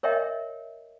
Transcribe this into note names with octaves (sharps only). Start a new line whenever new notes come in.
A#4 C#5 D#5 E5 G5